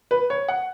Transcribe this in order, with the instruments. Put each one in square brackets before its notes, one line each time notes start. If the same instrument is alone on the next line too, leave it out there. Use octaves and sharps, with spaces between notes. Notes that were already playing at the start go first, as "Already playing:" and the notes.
[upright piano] B4
C#5
F#5